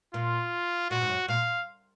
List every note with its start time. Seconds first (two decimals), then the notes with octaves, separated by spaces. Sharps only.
0.14 A#2 F4
0.90 A#2 F#4
1.01 G#2
1.09 F#2
1.28 A#2 F5